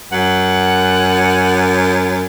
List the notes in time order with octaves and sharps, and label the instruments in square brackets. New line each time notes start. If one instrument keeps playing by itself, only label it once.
[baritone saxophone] F#2 [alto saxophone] F#5